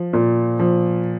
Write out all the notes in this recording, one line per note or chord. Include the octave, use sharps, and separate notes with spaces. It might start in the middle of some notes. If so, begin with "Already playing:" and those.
Already playing: F3
A#2
F3